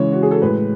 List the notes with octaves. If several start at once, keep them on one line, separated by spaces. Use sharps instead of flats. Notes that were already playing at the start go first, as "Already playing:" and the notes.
Already playing: C#3 E3 G#3 C#5
F#4
G#4
A4
A2 G#3 B4